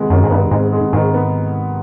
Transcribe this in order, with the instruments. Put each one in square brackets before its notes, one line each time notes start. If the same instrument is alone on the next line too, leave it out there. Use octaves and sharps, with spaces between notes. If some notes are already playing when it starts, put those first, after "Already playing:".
Already playing: [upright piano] C3 D#3 G#3 B3
[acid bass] F#2 [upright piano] D#3
[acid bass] G#2
[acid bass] G2 [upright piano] B3
[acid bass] G#2 [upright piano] C3
[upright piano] G#3
[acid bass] G#2 [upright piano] D#3
[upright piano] B3